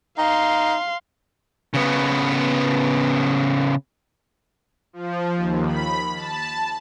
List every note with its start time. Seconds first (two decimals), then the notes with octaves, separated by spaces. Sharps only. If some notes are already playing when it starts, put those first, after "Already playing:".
0.18 D#4 F5 C6
1.74 C#3 B3
4.93 F3
5.35 D#2
5.66 B5
6.15 A5